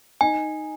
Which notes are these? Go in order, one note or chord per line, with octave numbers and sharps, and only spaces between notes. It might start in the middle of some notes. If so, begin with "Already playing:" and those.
D#4 G#5